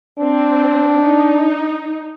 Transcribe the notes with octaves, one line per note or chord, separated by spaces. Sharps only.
C4 D4
D#4